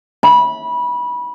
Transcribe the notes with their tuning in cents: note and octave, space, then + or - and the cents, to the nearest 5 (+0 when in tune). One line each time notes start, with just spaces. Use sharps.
B5 -20